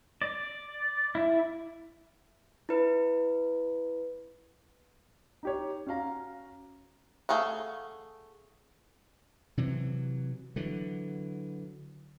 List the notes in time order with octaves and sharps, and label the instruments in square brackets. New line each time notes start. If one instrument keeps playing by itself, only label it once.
[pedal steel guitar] D5
E4
[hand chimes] E4 B4
[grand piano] D#4 G4 C#5
C#4 F#4 F5 A#5
[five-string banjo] A3 G#4 F5 F#5
[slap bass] C3 E3 F#3
D3 E3 F#3